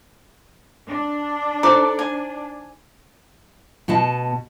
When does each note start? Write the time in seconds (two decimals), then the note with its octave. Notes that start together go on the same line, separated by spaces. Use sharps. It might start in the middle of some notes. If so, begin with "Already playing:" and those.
0.88 D4
1.63 D#4 A4 C5 D5 A#5 D6
1.99 G#5
3.88 B2 B3 D#5 A5